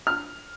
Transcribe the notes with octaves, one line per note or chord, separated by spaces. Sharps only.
F6